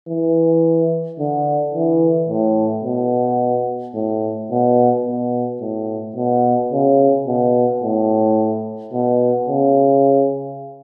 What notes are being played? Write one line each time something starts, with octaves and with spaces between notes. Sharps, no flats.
E3
D3
E3
A2
B2
A2
B2
B2
A2
B2
C#3
B2
A2
B2
C#3